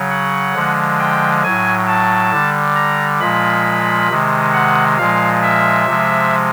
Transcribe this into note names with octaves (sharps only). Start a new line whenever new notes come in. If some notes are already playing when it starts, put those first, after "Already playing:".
Already playing: C#3 F#3
F#5
D3 F3 G#3
G5
A2 F#3 G#5
A5
D3 G3
A#5
A#2 F3 G#3 B5
C3 D#3 G#3
F#5
A#2 F3 G#3 F5
E5
C3 F3 G#3